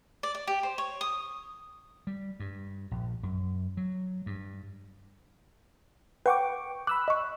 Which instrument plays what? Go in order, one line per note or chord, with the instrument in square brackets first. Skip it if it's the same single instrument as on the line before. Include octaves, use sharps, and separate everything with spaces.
[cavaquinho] D5
D5
G4
C5
C#5
D#6
[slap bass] G3
G2
A#1
F#2
F#3
G2
[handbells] B4 F#5 [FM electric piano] G5 C#6 D6
[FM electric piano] B5 E6 F#6 [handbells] D6
[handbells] D#5 C#6